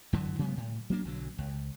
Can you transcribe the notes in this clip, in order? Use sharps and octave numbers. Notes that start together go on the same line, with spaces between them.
F#2 D3 E3 F#3
C3 F#3 G#3 B3
A2
F#3 A#3 D4
B1 D3 F#3
C#2